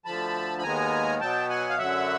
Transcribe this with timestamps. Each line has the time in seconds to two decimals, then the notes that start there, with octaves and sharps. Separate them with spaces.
0.05 D2 D3 F3 A5 B5
0.58 B5
0.63 D#2 D#3 G#3 B3 G#5 A#5
1.20 B2 F#3 B3 G5 A5
1.50 F#5 G#5
1.69 F5
1.78 F#2 D3 F#3 E5 F#5